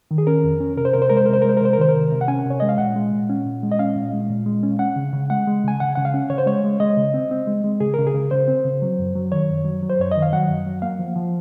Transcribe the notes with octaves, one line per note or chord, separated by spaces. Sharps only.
D#3
G#4
C#4 A#4
F2
C#4
C3 A#4
C5
C3 A#4
C5
G#3 A#4
C5
C3 A#4
C5
A#4
G#3 C5
A#4
C3 C5
A#4
D#3 C5
A#4
C3
C3
F#5
C#4 G#5
C3
C#5
G#3 D#5
F5
A#2 F#5
G#3
A#2
C#4
A#2
G#3
D#5
C#4 F5
A#2
G#3
A#2
G#3
C#4
C#4 F#5
C#3
C#3
G#3 F#5
G#3
C#3 G#5
C#3 F#5
C#3 F#5
F5
C#4
C#3 C#5
C5
G#3 C#5
G#3
G#3 D#5
C#3
C4
C4
G#3
G#3
C#3 G#4
C#3 A#4
G#4
C#3
C#3 C5
C4
C#3
F#3
F#2
F#3
D#3 C#5
F#2
F#3
F#3
C5
F#2 C#5
D#3 D#5
F5
F#3 F#5
F#2
F#3
A#3 F5
F3
F3